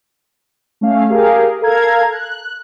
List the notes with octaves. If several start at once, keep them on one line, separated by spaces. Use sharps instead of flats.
A3 C#4 F5
G4 G#4 A#4 F5
A4 A#4 F5 A#5 G#6
F#6